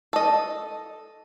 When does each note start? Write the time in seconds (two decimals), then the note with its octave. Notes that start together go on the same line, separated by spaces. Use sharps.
0.13 A4 D#5